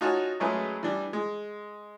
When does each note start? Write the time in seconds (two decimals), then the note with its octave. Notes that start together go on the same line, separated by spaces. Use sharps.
0.01 D#4 F4 F#4 C#5 G#5 A5
0.40 F#3 G#3 A3 C#4 G#4 B4
0.83 E3 G3 D4
1.13 G#3